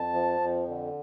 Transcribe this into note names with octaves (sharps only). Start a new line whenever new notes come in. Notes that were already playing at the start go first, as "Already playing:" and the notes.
Already playing: F2 A5
F3
F2
D3